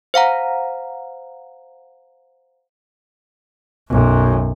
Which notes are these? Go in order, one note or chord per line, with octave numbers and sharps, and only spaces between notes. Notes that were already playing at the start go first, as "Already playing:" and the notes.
C5 F5 F#5 A#5
B1 F#2